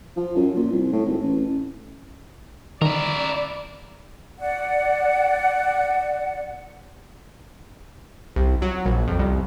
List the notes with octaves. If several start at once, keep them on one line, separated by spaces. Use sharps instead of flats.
F3
F#2
A#2
C2
A2
G#1
A1
D#3 E4 A#4 D5
D5 F#5
C2
F#3
A#1
F2
C2